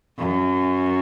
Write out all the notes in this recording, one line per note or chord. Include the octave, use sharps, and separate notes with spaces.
F#2